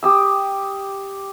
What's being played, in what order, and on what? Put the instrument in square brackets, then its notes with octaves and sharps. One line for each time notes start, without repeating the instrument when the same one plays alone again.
[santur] G4 D#6 E6